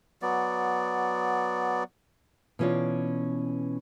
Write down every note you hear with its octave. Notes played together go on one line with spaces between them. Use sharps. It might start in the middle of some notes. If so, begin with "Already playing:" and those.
F#3 B3 D5
B2 E3 C#4 F4 D5